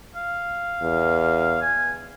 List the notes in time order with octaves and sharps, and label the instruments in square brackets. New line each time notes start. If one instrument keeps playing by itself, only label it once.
[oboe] F5
[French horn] E2
[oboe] G#5